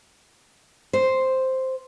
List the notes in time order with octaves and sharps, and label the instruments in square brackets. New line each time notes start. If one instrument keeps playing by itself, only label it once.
[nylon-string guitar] C5